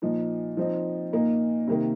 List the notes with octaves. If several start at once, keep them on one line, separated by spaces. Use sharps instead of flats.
A#2 F3 D#4
F3 C4 D#4
A#2 A#3 D#4
C3 D#3 A#3